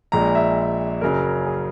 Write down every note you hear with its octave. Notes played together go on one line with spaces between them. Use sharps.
A#1 A#2 G#3 A#5
E5
F#1 F#2 C#3 F#3 A#4
G#4